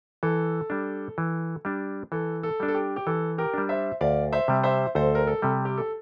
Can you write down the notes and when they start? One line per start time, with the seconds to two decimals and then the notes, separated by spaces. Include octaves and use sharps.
0.23 E3 A4
0.70 G3 D4
1.18 E3
1.65 G3 D4
2.12 E3 A4
2.43 A4
2.60 G3 D4
2.68 A4
2.74 G4
2.96 G4
3.06 E3 A4
3.38 G4 A#4
3.54 G3 D4
3.69 C5 E5
4.01 D2 D5 F5
4.33 C5 E5
4.48 C3 G3
4.64 C5 E5
4.95 D2 A4 C5
5.15 A#4
5.27 A4
5.42 C3 G3
5.65 G4
5.78 A4